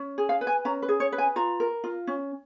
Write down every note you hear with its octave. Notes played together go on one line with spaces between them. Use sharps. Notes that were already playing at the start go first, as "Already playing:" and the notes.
Already playing: C#4
G#4
F5
B4
G#5
C#4 A#5
B4
G#4
C#5
B4
G#5
F4 A#5
A#4
F4
C#4